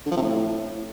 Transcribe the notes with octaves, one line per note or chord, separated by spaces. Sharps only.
D3
F3
C3
A2